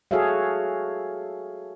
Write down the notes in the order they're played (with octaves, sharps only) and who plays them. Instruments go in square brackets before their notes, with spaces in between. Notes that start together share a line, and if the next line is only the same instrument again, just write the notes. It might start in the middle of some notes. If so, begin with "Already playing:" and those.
[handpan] F#4 G#4 A4 C#5 E5 F5